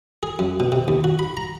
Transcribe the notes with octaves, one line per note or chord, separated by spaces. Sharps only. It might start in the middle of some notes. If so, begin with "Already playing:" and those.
G#4
F#2
B2
C3
D#2
F#4
B5
A#5